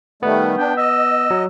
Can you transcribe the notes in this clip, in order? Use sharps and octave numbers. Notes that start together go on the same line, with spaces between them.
D#3 G3 A3 B3 F#5
D4 G5
D#5 E6
F#3